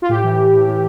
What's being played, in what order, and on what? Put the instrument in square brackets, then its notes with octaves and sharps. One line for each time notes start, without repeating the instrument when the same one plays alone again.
[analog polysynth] F4
A2 G4
E3
E3
A2
A2